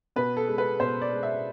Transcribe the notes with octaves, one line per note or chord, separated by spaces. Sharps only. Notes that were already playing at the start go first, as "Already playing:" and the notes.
B2 B4
A4
G#3
B4
B2 C5
D5
G#3
E5